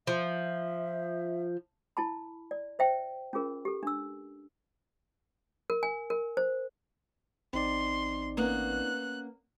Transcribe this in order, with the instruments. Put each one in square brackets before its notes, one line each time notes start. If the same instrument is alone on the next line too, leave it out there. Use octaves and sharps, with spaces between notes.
[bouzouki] F3 [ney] E5
[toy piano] E4 A5 B5
D5
C5 E5 G5
C#4 F4 G#4 A#4
G4 A4
D4 E6
A#4
G#5
A#4
C5
[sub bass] A1 [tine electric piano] C4 D#4 D5 [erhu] C6
[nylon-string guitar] A#3 B3 C#4 [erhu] F#6